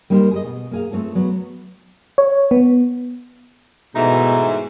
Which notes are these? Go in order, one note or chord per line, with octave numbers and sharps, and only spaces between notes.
G3 A#3 D#4 E4 G4 C5
G#4 B4 D#5
B2
A#3 G#4 F5
A3 A#3 C4 F4 A4
F#3 B3
C#5
B3
G#2 B2 E3 A3 D#4